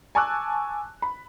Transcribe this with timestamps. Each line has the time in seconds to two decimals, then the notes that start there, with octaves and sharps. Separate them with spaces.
0.15 G#5 A5 C#6 D6 E6 F#6
1.02 B5